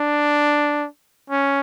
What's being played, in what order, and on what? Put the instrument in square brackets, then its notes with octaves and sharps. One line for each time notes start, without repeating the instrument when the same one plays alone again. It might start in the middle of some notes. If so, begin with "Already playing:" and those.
Already playing: [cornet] D4
C#4